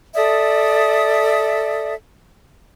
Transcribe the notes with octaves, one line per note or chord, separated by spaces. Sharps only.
A4 D5 E5 D#6